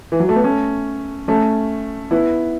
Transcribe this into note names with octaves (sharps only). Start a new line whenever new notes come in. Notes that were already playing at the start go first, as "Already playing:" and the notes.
E3
F#3
A3
B3
A3 C#4
A3 C#4
B3 E4